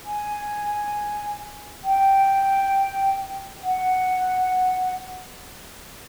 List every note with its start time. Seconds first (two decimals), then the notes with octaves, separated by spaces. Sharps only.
0.04 G#5
1.83 G5
3.63 F#5